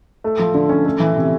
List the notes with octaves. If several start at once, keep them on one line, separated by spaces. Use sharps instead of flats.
A3
F3
D3
C#4
A3
E3
C3